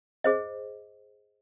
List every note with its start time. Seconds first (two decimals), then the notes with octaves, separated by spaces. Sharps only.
0.24 G#4 C5 D#5